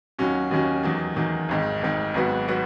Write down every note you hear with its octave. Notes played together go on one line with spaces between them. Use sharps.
D#2 D#3 F#3 C#4 F#4
D#2 D#3 F#3 C#4 F#4
E2 D#3 F#3
E2 D#3 F#3
G#1 G#2 D#3
G#1 G#2 D#3
G#1 G#2 F#3 B3 F#4
F#3 B3 F#4